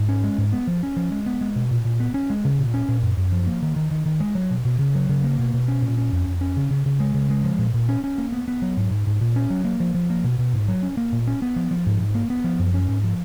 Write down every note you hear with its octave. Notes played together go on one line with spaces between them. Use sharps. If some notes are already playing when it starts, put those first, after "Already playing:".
Already playing: G#2
C#4
G#3
G#2
B3
F3
C#4
F3
G#3
B3
G#3
B2
A#2
A#2
B3
C#4
G#3
C#3
A#2
C#4
A#2
F#2
F#2
F3
A#3
D#3
D#3
D#3
D#3
G#3
F#3
B2
B2
C#3
F#3
C#3
A#3
B2
B2
C#4
A#2
C#4
F2
F2
C#4
C#3
C#3
C#3
G#3
C#3
G#3
F3
A#2
A#2
C#4
C#4
A#3
B3
B3
F#3
G#2
G#2
G#2
A#2
C#4
F#3
A#3
F3
F3
A#3
B2
B2
G#2
F#3
C#4
A#3
A#2
C#4
B3
F3
F3
G#2
G#2
A#3
B3
F3
F#2
C#4
G#2
F3